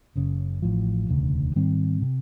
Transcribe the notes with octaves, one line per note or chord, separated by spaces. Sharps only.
F#1 F#2 C#3
A1 A2 F3
E1 D2 C#3
G#2 D#3 G3 C4
C3